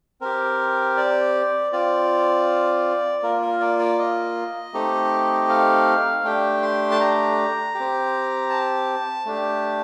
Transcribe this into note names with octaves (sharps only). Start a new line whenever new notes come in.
C4 G4 A#4
D5
C4 F4 D5
A#3 F4 A#4
A#4
D5
D5
D#5
A3 C4 D#4 G4
F5
A3 D4 G4 G5
C6
A5
A#5
G4
C4
A5
A3 D4 G4